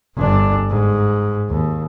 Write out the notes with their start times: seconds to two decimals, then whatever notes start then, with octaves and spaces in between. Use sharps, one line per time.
0.16 G1 D4
0.70 G#2
1.50 D#2